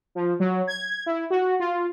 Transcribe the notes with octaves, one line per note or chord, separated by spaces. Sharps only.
F3
F#3
G#6
E4
F#4
F4